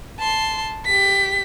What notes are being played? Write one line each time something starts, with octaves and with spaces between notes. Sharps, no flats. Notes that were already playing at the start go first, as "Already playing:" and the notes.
A5 C6
G4 B6